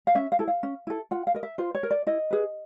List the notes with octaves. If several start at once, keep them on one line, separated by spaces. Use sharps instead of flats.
F5
C#4 E5
F5
E4 A4
F5
C#4
E4 A4
F4 F#5
F5
A#4 D#5
E5
F4 C5
C#5
A#4
D5
E4 D#5
G#4 B4